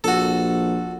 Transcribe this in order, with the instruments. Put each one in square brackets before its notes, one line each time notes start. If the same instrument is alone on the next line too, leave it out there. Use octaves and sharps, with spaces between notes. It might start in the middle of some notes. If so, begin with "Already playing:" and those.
[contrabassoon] A#1 [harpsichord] F#4 A4